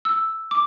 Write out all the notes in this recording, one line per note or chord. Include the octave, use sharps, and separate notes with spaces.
E6
D6